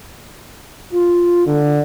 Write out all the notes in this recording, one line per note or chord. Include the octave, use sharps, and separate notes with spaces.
F4
D3